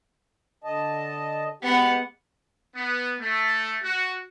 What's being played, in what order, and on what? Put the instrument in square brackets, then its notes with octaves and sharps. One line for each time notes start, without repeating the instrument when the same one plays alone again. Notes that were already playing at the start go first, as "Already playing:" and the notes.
[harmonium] D3 D#5 A5
[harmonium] G#3 G4 [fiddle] B3 F#5
[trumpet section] B3
A3
F#4